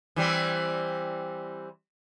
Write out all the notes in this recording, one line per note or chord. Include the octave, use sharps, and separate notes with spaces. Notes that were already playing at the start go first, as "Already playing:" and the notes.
E3 G3 C4